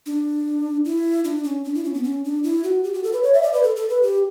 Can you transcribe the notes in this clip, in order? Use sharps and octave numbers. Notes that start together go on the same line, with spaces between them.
D4
E4
D4
C#4
D4
E4
C#4
B3
C#4
D4
E4
F#4
G4
F#4
A4
B4
C#5
E5
D5
B4
A4
A4
B4
G4